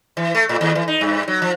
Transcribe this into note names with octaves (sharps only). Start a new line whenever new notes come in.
E3
A3
A2
D#2
E3
D#4
G2
F#3
F3